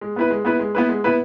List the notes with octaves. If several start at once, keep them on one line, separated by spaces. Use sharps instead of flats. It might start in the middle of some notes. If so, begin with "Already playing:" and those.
G#3
B3 E4 B4
G#3
B3 E4 B4
G#3
B3 E4 B4
G#3
B3 E4 B4